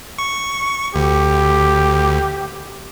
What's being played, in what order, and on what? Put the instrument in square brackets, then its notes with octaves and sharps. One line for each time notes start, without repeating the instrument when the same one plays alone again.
[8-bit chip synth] C#6
[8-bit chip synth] D2 [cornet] G4